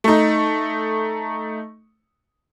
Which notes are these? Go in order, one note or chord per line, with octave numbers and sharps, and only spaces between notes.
A3 D#4